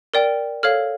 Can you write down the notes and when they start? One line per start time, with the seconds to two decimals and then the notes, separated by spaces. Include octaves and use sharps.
0.14 A#4 D5 G5
0.63 A4 C#5 F5 F6